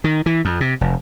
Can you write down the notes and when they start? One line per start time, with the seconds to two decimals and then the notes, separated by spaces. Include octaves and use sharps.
0.04 D#3
0.26 E3
0.45 F2
0.61 C3
0.81 F1